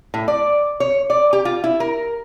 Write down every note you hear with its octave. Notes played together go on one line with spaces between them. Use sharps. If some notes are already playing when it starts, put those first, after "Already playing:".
A2
D5
C#5
D5
G4
F4
E4
A#4